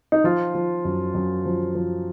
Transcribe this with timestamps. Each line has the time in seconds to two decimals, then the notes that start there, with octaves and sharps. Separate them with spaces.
0.12 D#4
0.24 F3 F4
0.55 F3
0.85 F#2
1.15 F#2
1.45 F3
1.75 F3